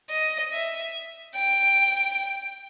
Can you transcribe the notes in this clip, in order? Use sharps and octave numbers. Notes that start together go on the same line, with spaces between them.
D#5
E5
G5